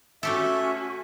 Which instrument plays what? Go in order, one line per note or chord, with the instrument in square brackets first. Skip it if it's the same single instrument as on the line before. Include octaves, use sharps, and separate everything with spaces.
[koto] A3 G4 A4 [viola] C#4 F#4 [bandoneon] E5